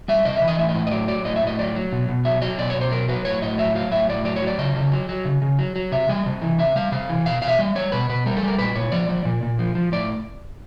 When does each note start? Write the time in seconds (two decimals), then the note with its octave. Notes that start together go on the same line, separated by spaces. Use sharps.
0.08 G3 E5
0.25 C3 D#5
0.36 E5
0.42 E3
0.48 D#5
0.59 A2 E5
0.69 D#5
0.75 A2
0.87 D#5
0.91 F#3 D5
1.08 F#3 D5
1.25 A2 D#5
1.36 E5
1.42 A2 D#5
1.59 F#3 D5
1.75 F#3
1.92 B2
2.08 B2
2.25 F#3 E5
2.42 F#3 D#5
2.58 B2 D5
2.70 B2 C#5
2.81 C5
2.91 F#3 A#4
3.09 F#3 B4
3.25 A2 C#5
3.41 A2 D#5
3.58 F#3 E5
3.75 F#3 F5
3.91 A2 E5
4.09 A2 D5
4.25 F#3 D5
4.36 C#5
4.42 F#3 D5
4.58 C#3 D#5
4.76 C#3
4.92 F#3
5.09 F#3
5.25 C#3
5.42 C#3
5.59 F#3
5.76 F#3
5.92 C3 E5
6.09 G3 D#5
6.26 C3
6.42 E3
6.58 C3 E5
6.76 G3 F5
6.92 C3 F5
7.09 E3
7.26 B2 F5
7.42 B2 F5
7.48 E5
7.59 G3 D#5
7.75 G3 C#5
7.92 B2 B4
8.09 B2 B4
8.26 G3 A#4
8.37 A4
8.43 G3 A#4
8.59 A#2 B4
8.75 A#2 C#5
8.92 F3 D5
9.09 F3
9.25 A#2
9.43 A#2
9.59 F3
9.75 F3
9.92 A2 D5